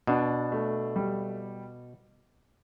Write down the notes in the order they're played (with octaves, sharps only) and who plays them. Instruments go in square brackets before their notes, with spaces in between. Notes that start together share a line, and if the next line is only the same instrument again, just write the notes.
[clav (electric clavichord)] B2 [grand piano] D4
[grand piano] A3
G3